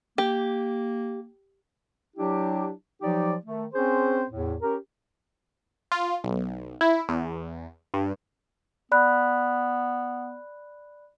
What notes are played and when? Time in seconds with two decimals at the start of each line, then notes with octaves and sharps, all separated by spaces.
0.18 A#3 G4
2.17 F#3 D4 E4 G4
3.02 F3 F#3 D#4 G4 D5
3.44 D#3 A3
3.74 C4 C#4 G#4 C5
4.30 E2 A2
4.62 C#4 G4 A#4
5.92 F4
6.24 B1
6.81 E4
7.09 E2
7.94 G2
8.92 B3 D5 B5 F#6